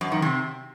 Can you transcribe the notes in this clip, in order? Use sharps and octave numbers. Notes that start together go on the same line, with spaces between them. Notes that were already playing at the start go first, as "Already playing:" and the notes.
F#2
D#3
C3